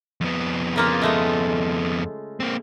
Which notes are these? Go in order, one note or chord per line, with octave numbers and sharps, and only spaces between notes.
F2 B3
C#3 A#3 F4
G#3 A3 F4
A#3 C4